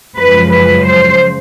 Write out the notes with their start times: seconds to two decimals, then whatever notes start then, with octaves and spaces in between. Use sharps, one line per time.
0.17 F#2 C#3 F3 G#3 B4
0.50 B4
0.83 C5